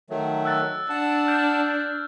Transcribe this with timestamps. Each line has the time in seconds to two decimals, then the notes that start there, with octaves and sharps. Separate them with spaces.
0.10 D#3 F#3 A3
0.45 E6 F#6 A6
0.90 D4 F#5 A5
1.27 F6 G6 A6